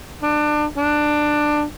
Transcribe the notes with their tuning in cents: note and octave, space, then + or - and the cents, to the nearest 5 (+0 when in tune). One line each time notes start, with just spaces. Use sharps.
D4 +25
D4 +15